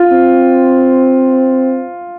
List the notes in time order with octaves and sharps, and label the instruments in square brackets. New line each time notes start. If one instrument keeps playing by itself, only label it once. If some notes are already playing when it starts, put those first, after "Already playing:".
Already playing: [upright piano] F4
[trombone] C4